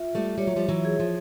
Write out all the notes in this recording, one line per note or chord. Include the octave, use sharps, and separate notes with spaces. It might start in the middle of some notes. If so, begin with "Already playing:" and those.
Already playing: F4 E5
G3 A3
G3 C#5
F#3
F3 G3
E3 F#3
G#4
F3